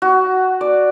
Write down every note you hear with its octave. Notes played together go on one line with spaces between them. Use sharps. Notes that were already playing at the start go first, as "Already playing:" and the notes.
F#4
D5